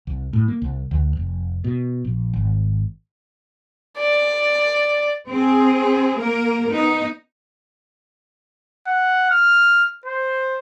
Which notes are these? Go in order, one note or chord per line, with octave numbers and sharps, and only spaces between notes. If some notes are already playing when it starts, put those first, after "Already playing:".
C2
A2
A#3
C2
D2
F1
B2
A#1
G#1
D5
C4 G#4
A#3 A#4
B3 D#4
F#5
F6
C5